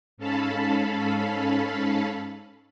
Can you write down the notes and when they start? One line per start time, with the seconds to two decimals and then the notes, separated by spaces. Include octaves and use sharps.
0.17 G#2 C#4 A4 F5 A5 B5